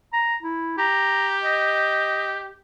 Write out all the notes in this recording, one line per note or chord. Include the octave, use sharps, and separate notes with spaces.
A#5
E4
G4 A#5
D#5